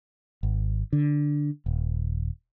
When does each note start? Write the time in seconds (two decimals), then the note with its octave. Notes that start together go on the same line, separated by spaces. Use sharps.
0.43 G#1
0.93 D3
1.66 D#1